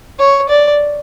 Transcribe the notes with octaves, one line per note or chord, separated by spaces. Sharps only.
C#5
D5